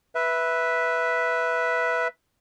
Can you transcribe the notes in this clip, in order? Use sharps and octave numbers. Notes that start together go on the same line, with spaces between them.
B4 E5